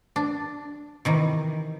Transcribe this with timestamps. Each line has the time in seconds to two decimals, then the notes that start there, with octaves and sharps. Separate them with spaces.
0.16 D4
1.05 C3 D#3 E3